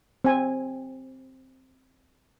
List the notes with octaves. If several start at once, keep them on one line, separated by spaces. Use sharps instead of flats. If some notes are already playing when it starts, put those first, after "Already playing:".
C4 G#5